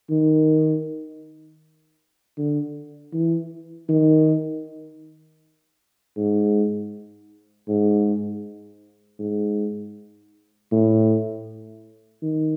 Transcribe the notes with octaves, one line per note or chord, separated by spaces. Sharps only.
D#3
D3
E3
D#3
G#2
G#2
G#2
A2
D#3